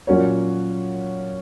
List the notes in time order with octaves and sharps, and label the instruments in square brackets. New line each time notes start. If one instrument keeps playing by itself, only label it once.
[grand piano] A#2 F#3 C#4 F#4 C#5